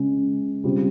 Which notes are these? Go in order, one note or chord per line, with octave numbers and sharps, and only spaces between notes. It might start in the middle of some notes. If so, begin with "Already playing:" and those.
Already playing: C#3 G#3 C#4
C#3 G3 C4 F4